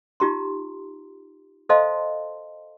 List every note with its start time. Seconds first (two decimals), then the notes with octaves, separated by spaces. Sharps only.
0.20 D#4 F4 G4 A#5 C6
1.69 A4 C5 D#5 F5 A5 C6